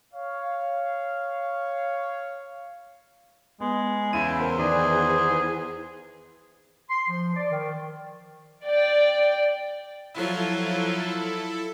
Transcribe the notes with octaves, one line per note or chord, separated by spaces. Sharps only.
C#5 F5
G#3 B3
E2 C#3 E4 D#7
A#4 C5
D#3 G#4 D5
C6
F3
D5
D#3
D5 G5
F3 F#3 E4 F4 A4